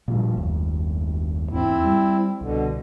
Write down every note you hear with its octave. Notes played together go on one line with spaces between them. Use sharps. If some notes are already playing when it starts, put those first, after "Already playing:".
A#2 F3 G3
F#1 D#2
E2 G#2 C4 E4
G3
C2 B2 D3